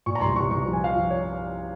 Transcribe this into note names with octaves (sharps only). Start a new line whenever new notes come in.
A#2 C#6
A#5
C2 C6
C2 C#6
C2 C#6
F3
G#5
F3 F5
F3
C#5